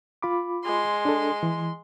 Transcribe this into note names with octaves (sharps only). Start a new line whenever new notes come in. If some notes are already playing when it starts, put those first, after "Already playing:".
F4 B5 D6
G#3 C6
D4 A4
E3